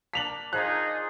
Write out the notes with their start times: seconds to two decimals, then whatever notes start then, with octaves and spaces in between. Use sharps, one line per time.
0.13 A#3 D4 B6 F7 F#7
0.53 F3 D#4 F4 G#4 F#6